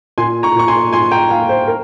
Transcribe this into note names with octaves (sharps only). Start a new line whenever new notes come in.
A#2 G#5 C6
A#5 C#6
A#2 C#6
G#5 C6
F3 G#5 C6
G5 A#5
F3 F5 G#5
C5
A#4